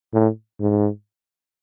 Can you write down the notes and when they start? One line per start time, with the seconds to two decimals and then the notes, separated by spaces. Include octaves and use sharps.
0.14 A2
0.60 G#2